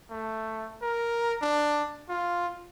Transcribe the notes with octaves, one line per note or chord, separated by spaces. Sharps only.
A3
A#4
D4
F4